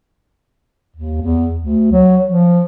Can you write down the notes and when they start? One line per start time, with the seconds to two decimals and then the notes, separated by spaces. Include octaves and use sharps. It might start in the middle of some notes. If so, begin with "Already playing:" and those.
0.96 D#2
1.22 E2
1.59 D2
1.92 F#3
2.27 F3